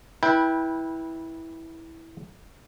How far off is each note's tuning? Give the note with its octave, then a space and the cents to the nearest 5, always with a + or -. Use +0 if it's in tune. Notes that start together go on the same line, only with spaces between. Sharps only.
E4 -10 B4 -20 G5 +10